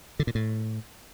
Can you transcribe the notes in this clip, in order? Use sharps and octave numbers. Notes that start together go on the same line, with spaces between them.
D3
A#2
A2